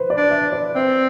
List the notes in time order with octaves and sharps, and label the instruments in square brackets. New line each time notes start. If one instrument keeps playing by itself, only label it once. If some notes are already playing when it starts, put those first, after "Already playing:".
Already playing: [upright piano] B4 C5
D5
[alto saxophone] D4
[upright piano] E5
D5
[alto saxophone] C4 [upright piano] E5